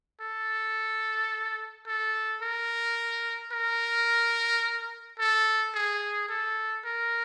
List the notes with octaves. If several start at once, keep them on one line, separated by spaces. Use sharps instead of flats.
A4
A4
A#4
A#4
A4
G#4
A4
A#4